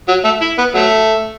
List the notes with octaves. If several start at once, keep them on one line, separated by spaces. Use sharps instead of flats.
F#3
A3
E4
B3
F#3 A3